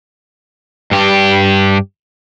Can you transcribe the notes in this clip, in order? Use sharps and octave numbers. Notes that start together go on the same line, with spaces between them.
G2 G4